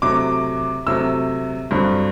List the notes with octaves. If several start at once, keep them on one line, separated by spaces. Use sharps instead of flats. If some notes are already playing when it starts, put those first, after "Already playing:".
C3 F#3 A3 D6
C3 F#3 A3 E6
G2 D3 F#3 C4